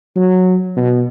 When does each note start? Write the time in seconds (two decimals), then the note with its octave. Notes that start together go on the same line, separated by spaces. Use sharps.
0.16 F#3
0.76 B2